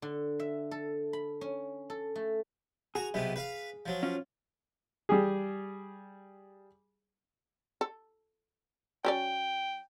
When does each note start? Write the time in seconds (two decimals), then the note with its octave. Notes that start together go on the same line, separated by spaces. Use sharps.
0.02 D3
0.40 E5
0.71 A4
1.13 B5
1.41 C#4
1.90 A4
2.16 A3
2.95 F#4 G#4 A#5
3.14 B1 C3 B3
3.36 B4 F5
3.86 F3 F#3
4.03 C#4 F4
5.09 G3 G4 G#4
7.81 A4
9.05 F#3 C#4 D5 G5